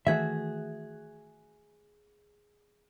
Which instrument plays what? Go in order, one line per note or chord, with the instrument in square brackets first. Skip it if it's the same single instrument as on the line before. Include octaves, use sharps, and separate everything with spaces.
[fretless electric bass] D#3 E3 A3 [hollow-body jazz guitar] F#4 G#4 E5